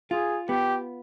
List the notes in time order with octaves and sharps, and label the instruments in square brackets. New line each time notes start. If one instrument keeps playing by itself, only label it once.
[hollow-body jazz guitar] F4 [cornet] G#4
[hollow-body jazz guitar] B3 [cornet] G4